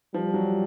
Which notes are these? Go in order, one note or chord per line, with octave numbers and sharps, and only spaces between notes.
F3 G3
F#3